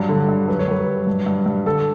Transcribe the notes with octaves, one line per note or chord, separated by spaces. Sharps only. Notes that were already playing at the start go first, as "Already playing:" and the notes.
Already playing: G2 F#3
D3
G2
F#2 B4
C#5
G3 B4
F#2
G2
G2
G2
D3 A4